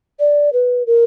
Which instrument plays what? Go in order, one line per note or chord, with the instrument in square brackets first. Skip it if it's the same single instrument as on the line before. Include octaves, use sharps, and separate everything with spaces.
[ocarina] D5
B4
A#4